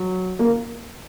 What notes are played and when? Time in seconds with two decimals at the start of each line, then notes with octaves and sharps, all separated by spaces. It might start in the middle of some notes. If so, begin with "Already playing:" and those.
Already playing: F#3
0.39 A#3